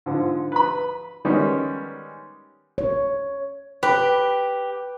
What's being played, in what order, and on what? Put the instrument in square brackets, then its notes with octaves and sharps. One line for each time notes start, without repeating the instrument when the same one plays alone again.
[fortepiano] G#2 D3 F3
B4 B5
D#3 G3 G#3 B3 C#4
[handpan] C#5
[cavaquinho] G4 [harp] B4